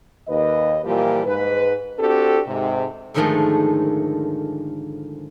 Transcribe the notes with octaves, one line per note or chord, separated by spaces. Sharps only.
D#2 B4 D#5
A#2 E3 F3 G3 A#3 G4
G#2 B4
C4 D4 F#4 G4 A4
G#2 C3
G#2 D3 D#3 F3 G#3 A3